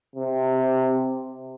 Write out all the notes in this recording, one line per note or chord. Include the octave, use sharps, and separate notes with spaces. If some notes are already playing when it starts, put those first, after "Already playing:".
C3